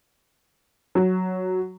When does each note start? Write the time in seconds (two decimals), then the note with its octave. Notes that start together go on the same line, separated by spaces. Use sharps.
0.95 F#3